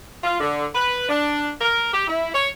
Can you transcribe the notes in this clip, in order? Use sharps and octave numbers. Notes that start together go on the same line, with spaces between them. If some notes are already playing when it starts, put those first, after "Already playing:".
F4
D3
B4
D4
A#4
G4
E4
C#5